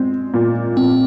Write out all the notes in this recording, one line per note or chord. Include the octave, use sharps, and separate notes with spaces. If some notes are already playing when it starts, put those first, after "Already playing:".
Already playing: G#3 C4
A#2
A#2 C4